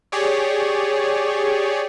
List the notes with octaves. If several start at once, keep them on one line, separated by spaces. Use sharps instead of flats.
G4 G#4 C#5 D5